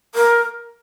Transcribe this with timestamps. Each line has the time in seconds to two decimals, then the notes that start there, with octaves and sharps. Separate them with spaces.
0.15 A#4